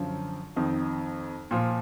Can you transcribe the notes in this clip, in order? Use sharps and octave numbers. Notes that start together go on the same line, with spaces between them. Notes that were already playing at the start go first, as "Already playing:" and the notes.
Already playing: F#2 D3 F3
F2 D#3
A#2 F3